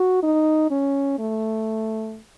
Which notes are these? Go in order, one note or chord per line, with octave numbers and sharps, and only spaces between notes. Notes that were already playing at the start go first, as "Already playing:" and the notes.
Already playing: F#4
D#4
C#4
A3